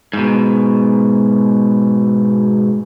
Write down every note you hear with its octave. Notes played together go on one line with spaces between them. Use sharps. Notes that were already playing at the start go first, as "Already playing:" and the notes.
G#2 B2